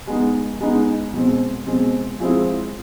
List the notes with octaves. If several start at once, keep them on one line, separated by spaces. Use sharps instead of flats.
G#3 B3 D#4
G#3 B3 D#4
B2 G#3 C4
B2 G#3 C4
F3 G#3 C4 E4 G#4